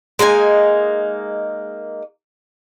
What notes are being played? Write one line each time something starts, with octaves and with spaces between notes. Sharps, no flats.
G#3 A#3 D#4 G#5